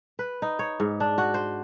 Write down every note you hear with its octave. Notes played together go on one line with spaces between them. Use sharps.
B4
D#4
C#5
G#2
D4
F#4
C5